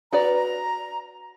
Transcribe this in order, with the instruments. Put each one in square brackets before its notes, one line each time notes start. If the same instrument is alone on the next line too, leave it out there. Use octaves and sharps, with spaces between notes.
[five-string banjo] F#4 B4 D5 [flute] A#5